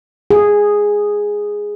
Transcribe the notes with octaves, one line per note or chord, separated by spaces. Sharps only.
G#4